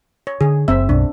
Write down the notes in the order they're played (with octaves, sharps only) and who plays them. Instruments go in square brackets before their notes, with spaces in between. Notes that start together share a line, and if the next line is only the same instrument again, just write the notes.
[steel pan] C#5
[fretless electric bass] D3 [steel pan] G#4
[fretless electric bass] F#1 [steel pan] C4 E5
[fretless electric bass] B1 F#2 [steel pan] D4